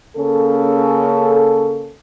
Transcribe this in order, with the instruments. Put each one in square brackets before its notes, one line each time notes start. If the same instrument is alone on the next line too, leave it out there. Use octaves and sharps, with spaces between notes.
[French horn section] C#3 A#3 C#4 A4